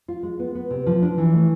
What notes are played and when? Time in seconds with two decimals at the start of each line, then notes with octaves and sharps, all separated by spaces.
0.08 F4
0.23 G#3
0.39 B3
0.55 B3
0.70 C3
0.87 F3
1.02 D4
1.18 E3
1.34 A3